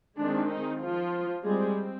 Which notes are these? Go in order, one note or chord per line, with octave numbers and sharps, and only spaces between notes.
D#3 G#3 C4 D4
D#4
F3 F4
G3 G#3 C4 G#4